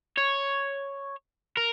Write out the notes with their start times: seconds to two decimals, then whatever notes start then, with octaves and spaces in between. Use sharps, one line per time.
0.18 C#5
1.57 A#4